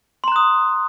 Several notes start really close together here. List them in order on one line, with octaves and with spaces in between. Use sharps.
C6 A#5 F#6 D#6